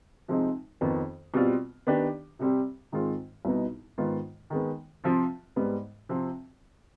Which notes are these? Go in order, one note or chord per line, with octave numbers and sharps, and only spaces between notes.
C3 F3 G#3 C4 D#4
F2 D#3 B3
B2 G3 C4 F4
D#3 B3 D4 G4
C3 G3 C4 G4
G#2 D#3 G#3 C4 F4
C2 B2 B3 D#4
G#2 D#3 B3 F4
D#3 G#3 B3
C3 F3 C4 F4
G#2 G3 B3
C3 F3 C4